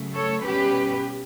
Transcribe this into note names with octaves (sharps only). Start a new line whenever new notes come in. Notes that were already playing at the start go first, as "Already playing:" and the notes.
Already playing: C#3 F#3 A3
A4 C#5
B2 G3 C#4 G4 B4